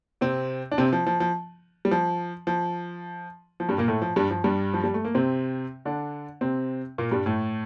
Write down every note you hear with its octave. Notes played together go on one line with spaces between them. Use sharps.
C3 C4
D4
C3 C4
F3
F3
F3
G3
F3
F3
F3
G2 G3
A#2 A#3
A2 A3
F3
G2 G3
F3
G2 G3
F3
G3
A3
A#3
C3 C4
D3 D4
C3 C4
A#2 A#3
G2 G3
A2 A3